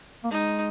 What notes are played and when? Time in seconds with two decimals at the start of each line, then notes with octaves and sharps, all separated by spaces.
0.24 A#3
0.31 G#3 D#4